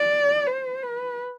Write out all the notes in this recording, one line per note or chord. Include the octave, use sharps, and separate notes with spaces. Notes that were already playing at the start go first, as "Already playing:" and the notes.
Already playing: D5
C5
B4